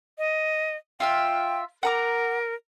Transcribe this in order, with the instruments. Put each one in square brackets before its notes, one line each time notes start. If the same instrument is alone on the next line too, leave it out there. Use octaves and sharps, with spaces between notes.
[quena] D#5
[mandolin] F4 E5 F5 [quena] G5
[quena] A#4 [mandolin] F#5 A#5 D6